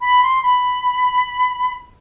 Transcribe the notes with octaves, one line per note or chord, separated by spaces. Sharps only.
B5
C6
B5